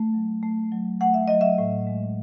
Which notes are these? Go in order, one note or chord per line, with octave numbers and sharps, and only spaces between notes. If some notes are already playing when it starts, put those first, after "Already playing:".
Already playing: A3
F#3
A3
F#3
A3 F#5
E5
F#3 D#5
E5
A2
G#3